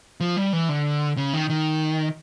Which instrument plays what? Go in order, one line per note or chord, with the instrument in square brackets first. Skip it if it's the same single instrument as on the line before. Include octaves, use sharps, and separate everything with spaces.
[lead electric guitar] F3
G3
E3
D3
C#3
D#3
D#3